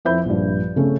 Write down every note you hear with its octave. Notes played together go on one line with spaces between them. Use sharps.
F2 E4 C5 E5 B5 G6
A#1 G2
C#3 A3 C4 C#4